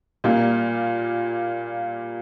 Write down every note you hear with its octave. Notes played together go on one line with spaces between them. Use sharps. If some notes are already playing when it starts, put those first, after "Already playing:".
A#2 G3 A#3 F4